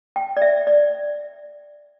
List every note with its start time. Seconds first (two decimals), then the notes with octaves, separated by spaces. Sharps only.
0.16 G5
0.37 D5
0.42 E5
0.67 D5